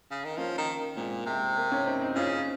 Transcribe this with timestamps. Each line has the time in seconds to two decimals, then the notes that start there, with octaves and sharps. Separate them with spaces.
0.11 C#3
0.25 D#3
0.38 F3 A#3 C#4
0.58 D#3
0.97 A#2 G#3 C4
1.26 C3 G#3
1.57 A#3
1.71 A#3 C#4
1.86 C4 D#4
2.01 C4 D#4
2.16 C#3 C#4 F4